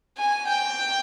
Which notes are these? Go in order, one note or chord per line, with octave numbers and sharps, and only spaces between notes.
G#5
G5